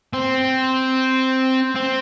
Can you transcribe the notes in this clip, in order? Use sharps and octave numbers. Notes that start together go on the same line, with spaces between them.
C4
C4